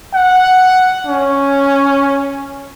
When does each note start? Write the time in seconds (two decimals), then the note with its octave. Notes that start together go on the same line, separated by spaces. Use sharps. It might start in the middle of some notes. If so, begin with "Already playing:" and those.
0.14 F#5
1.06 C#4